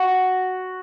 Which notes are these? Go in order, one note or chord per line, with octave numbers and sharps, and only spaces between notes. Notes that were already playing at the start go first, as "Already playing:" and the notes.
Already playing: F#4